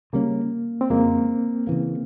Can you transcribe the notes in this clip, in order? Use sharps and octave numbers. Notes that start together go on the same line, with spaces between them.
C#3 G3 A#3 C#4
C4
F2 C#3 F3 G#3 A#3
C#3 E3 A#3